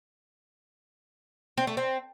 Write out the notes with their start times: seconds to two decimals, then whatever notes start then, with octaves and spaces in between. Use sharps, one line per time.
1.57 C4
1.67 A3
1.77 C4